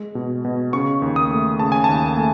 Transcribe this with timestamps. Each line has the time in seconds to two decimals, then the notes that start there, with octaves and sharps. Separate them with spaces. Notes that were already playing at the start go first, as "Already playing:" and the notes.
Already playing: G#3
0.15 B2
0.45 B2
0.73 C#3 C#6
1.02 D#2
1.16 D#6
1.31 A3
1.59 C#3 A5
1.72 G#5
1.84 D#2 A5
2.17 A3